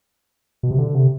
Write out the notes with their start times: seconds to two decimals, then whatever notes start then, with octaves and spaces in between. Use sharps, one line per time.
0.63 B2
0.71 C3
0.78 D3
0.95 C3